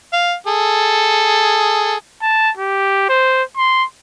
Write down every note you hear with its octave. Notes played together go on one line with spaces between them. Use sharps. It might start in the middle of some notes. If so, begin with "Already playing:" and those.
F5
G#4 A4
A5
G4
C5
C6